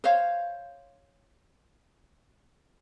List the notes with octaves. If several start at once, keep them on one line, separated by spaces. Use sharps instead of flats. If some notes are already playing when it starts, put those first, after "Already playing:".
C5 C#5 F5